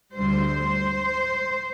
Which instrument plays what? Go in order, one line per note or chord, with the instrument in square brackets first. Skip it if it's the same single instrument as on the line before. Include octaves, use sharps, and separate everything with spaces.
[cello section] D2 D3 G3 C5